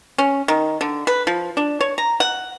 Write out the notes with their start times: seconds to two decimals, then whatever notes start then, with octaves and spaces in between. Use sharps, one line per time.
0.18 C#4
0.48 D#3
0.81 D3
1.07 B4
1.27 F3
1.57 D4
1.81 C#5
1.98 A#5
2.20 F#5